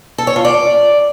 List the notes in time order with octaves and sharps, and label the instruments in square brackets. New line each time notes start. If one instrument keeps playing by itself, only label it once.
[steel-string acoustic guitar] A4
C#5
F4
D5